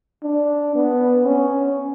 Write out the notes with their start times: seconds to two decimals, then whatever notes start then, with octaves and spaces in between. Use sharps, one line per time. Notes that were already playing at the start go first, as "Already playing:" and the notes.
0.23 D4
0.75 B3
1.26 C#4